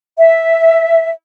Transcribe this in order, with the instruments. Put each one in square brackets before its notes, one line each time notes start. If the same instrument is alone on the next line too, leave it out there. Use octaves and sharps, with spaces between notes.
[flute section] E5